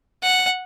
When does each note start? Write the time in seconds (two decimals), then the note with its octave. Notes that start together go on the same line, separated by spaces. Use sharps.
0.23 F#5